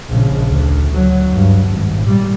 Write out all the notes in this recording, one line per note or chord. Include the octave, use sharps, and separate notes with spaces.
A#1 C#3
D2
F#3
G2
G#1
A#2 G3